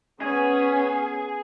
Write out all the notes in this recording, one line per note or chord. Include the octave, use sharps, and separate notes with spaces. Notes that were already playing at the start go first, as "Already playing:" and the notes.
B3 C#4 G#4